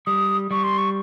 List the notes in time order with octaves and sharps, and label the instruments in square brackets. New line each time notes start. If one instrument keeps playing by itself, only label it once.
[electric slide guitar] G3 [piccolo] D#6
[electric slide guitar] G3 [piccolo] C#6
[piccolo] C6
C#6